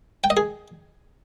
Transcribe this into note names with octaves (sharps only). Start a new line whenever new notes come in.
G5
D#5
G#4